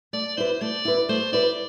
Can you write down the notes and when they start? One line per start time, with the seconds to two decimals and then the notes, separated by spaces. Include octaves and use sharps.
0.13 A3 D5
0.37 E4 B4 C5
0.61 A3 D5
0.85 E4 B4
1.09 A3 C5
1.32 E4 B4 D5